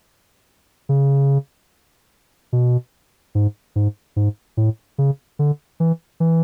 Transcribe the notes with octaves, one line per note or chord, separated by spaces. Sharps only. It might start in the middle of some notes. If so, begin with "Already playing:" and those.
C#3
B2
G#2
G#2
G#2
A2
C#3
D3
E3
E3